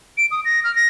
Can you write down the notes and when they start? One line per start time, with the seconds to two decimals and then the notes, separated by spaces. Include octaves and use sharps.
0.18 D7
0.31 D#6
0.45 A#6
0.64 F6
0.76 A#6